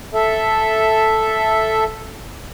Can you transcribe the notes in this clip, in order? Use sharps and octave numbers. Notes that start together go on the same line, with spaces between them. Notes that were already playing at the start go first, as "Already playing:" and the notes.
A4 E5